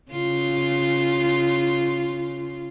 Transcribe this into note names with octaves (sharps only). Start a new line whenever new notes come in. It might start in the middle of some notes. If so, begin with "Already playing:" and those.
C#3 F4